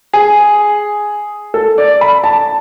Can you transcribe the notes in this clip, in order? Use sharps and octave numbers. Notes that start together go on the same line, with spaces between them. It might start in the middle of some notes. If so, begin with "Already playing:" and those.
G#4
A4
D5
B5
A5